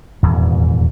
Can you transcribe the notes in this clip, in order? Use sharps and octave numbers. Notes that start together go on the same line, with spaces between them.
D#1 E2 G#2